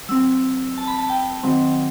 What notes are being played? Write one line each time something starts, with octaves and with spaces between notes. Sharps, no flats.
F#3 C4 E6
A5
B5
A5
G5
D#3 F#3 C4